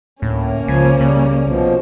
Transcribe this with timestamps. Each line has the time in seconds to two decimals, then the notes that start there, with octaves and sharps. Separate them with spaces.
0.22 D2 A2 A#3 C#4
0.68 C#2 C#3 F3 G#5
1.01 C#3 G3
1.46 C2 B2 F3